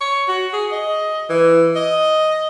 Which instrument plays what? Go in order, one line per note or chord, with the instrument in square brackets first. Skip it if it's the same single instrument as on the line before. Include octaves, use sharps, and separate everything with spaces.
[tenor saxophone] C#5
F#4
G#4
D#5
E3
D#5